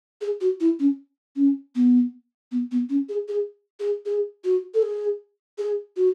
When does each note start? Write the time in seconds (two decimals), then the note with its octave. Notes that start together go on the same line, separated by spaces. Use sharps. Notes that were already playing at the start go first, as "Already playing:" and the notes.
0.21 G#4
0.41 F#4
0.60 E4
0.79 C#4
1.36 C#4
1.75 B3
2.52 B3
2.71 B3
2.89 C#4
3.09 G#4
3.28 G#4
3.80 G#4
4.06 G#4
4.44 F#4
4.74 A4
4.83 G#4
5.58 G#4
5.96 F#4